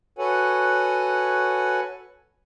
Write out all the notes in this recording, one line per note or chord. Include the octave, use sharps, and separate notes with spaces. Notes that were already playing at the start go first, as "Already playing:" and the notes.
F#4 A4 B4 C#5 F#5 G#5